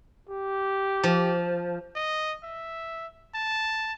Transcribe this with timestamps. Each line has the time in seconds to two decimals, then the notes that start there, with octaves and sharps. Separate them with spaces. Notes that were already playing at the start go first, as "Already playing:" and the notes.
0.29 G4
1.03 F3
1.95 D#5
2.43 E5
3.35 A5